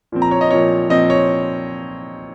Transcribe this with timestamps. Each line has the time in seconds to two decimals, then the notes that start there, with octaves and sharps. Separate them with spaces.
0.12 A#2 F3 C4
0.22 A#5
0.31 C#5
0.41 D#5
0.51 A#2 F3 C4 C#5
0.89 A#2 F3 C4 D#5
1.10 C#5